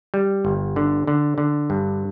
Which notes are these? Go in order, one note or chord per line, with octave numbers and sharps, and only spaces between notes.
G3
G1
D3
D3
D3
G2